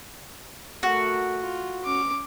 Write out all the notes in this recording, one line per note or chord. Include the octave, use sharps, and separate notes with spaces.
A3 F#4 A#4
F4
C#4 D6